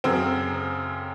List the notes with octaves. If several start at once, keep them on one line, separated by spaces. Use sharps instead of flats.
F#2 C#3 F#3 C4